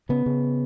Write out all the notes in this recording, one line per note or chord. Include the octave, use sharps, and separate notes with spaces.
C#3 B3
C#3